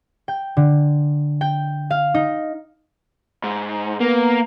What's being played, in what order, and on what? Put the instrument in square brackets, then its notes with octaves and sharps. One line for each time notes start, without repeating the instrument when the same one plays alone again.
[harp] G5
D3
G5
F5
D#4
[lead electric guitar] G#2
[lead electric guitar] A#3 [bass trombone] B3